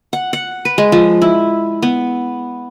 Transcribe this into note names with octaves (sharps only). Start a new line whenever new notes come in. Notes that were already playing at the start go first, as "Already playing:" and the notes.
F#5
F#5
B4
G#3
F3
E4
B3